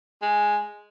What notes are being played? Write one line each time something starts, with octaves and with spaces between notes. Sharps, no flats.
G#3